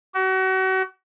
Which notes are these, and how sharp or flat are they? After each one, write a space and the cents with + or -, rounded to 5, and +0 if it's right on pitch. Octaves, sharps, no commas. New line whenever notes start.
F#4 +35